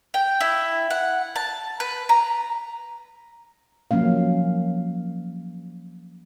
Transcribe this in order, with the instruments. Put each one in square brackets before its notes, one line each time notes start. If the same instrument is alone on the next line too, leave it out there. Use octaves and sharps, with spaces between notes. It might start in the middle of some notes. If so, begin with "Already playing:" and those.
[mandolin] G5
E4
F#5
A5
B4
A#5
[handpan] F3 F#3 A#3 C#4 F5